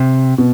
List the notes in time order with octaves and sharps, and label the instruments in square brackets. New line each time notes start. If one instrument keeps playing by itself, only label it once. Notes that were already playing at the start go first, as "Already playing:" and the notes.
Already playing: [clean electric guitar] C3
[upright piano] B2